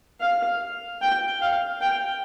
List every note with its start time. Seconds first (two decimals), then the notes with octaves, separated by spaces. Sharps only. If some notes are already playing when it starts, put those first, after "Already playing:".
0.20 F5
1.02 G5
1.41 F5
1.81 G5